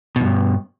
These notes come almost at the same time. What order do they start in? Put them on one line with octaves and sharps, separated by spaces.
B2 E2 G2